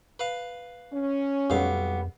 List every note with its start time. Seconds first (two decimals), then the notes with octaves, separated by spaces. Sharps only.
0.19 B4 F5
0.93 C#4
1.50 B1 F2 G3 B3 F5